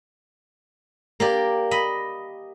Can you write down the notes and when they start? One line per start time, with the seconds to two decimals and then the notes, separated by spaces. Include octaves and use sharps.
1.20 A#3 G4 D5
1.71 D#5 B5